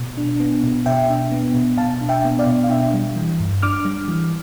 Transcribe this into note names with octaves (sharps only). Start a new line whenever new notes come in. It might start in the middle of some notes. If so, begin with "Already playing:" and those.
Already playing: B2
D4
B3
B2
B2 E5 G5
D4
B3
B2
B2 F5 A5
D4
E5 G5
B3
D5 F5
B2
F5
D4 E5 G5
G3
E3
G2
D4 D6 F6
G3
E3